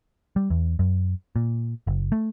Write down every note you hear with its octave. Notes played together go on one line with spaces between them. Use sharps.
G3
E2
F#2
A#2
F#1
A3